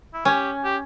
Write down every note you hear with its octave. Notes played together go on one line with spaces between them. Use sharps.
E4
C#4 G4
G4